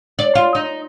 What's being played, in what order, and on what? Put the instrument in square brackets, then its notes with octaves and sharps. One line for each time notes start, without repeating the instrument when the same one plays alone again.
[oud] D5
F4
D#4